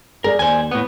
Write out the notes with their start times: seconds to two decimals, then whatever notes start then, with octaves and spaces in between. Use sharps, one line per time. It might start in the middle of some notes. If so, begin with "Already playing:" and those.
0.24 G#4 A#4 D5
0.39 D#2 C5 G#5
0.71 A2 B3